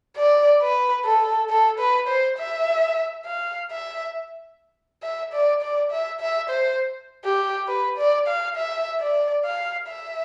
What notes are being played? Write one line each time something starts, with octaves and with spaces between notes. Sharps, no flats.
D5
B4
A4
A4
B4
C5
E5
F5
E5
E5
D5
D5
E5
E5
C5
G4
B4
D5
F5
E5
D5
F5
E5